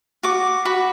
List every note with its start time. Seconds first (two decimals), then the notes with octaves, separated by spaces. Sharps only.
0.23 F#4 D6
0.65 F#4 B5